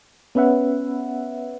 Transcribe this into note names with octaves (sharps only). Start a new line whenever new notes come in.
B3 C#4 B4 E5 F#5